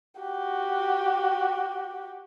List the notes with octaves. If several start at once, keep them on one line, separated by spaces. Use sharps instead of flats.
F#4 G4